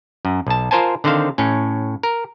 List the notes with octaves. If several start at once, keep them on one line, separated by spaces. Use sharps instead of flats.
F#2
B1 A5
F4 A#4 C5 G#5 A5
D3 D#3 C4 C5 F5
A2 C#4
A#4